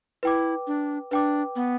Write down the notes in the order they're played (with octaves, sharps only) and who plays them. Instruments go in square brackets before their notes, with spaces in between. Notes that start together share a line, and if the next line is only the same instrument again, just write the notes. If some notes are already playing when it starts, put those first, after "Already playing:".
[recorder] E4 [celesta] B4 G5 D6
[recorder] D4
[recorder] D4 [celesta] B4 G5 D6
[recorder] B3